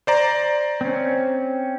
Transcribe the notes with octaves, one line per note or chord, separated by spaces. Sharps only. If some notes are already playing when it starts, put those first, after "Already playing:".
C5 D5 A#5
C4 C#4